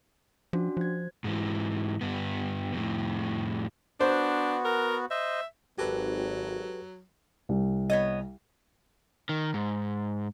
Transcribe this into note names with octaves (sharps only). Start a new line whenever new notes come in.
F3 C#4 D4 F#4
F3 C5 G#6
G#2 E3
G2 B3
F2 A2
B3 D4 F#4 C5
A#4
C5 D#5 E5
G#1 F#3 G4 A4 B4
C2
B3 C#5 D#5
D#3
G#2